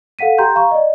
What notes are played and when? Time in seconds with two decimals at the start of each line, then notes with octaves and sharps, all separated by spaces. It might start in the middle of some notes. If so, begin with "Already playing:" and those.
0.19 A4 F5 F#5 B6 D#7
0.38 G4 G5 A#5 C6 G6
0.55 F5 A#5 C#6
0.71 D5 D#5